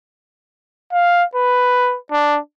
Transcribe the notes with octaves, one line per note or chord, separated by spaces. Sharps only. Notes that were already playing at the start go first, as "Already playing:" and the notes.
F5
B4
D4